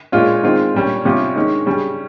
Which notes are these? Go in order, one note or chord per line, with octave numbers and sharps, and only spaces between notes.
A#2 G#3 C#4 F4
D#3 G#3 C4 F4
A#2 G3 C#4
C3 G3 C#4 F4
D#3 G#3 C#4
C#3 G3 C#4